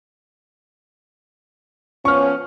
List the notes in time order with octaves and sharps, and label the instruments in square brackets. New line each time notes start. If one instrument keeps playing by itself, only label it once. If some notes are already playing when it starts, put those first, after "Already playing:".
[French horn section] F3 B3 C#4 [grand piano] C#6 F6